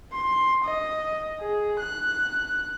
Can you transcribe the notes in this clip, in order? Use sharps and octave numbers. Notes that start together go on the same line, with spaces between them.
C6
D#5
G#4
F#6